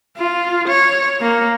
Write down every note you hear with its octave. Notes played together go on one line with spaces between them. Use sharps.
F4
C#5
A#3